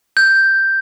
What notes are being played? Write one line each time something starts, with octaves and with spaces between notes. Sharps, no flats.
G6